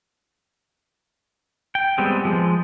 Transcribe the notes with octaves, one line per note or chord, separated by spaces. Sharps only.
G5
G3 G#3 B3 C4
F3 G#3